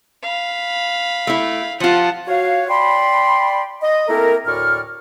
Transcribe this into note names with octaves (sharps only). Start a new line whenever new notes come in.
F5 B5
A3 E4
F3 F4 F#5 A5
F#4 C#5 F5
D5 G5 B5 C6
D#5
A3 A#3 C4 E4 A4 A#4
D2 A2 D5 C#6 F6